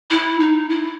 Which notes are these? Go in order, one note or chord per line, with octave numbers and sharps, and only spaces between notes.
E4
D#4
E4